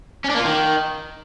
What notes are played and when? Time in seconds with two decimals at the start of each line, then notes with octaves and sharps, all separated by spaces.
0.24 C#4
0.29 D4
0.35 A#3
0.40 F4
0.45 D#3